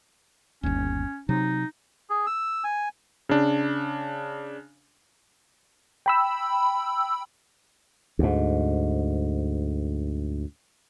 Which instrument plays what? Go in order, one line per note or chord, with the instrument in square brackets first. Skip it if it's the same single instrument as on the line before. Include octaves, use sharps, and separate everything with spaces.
[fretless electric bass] G1 D#2 [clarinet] C#4
[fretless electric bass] C3 F#3 [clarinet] D#4
[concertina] G#4
E6
G#5
[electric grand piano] C#3 D4
[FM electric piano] G5 B5 E6
[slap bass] D2 G#2